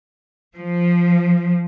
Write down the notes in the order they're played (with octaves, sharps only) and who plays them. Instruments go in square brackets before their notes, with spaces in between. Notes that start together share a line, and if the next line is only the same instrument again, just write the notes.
[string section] F3